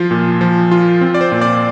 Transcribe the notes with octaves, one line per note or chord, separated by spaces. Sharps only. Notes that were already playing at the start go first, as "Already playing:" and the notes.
Already playing: F3 F4
A#2
F3
F4
C4
D5
C5
A#2
D5